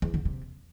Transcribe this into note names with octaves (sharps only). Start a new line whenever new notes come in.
E2
D3
C3